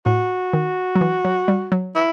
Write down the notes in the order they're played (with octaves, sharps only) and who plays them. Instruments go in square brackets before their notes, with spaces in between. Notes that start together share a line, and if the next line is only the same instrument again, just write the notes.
[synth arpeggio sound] A2 [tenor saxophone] F#4
[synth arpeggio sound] D#3
F#3
E3
F#3
G3
F#3
[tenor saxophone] E4